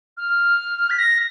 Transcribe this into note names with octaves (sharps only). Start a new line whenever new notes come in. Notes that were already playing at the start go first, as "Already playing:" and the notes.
F6
B6
A#6